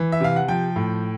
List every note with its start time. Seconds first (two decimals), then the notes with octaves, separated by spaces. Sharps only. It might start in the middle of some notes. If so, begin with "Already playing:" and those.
Already playing: E3
0.12 E5
0.20 C3 F5
0.36 F#5
0.48 F3 G5
0.76 A2